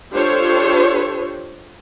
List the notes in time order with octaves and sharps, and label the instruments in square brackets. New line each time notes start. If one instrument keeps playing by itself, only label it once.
[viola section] D4 F4 G4 A4 C5 C#5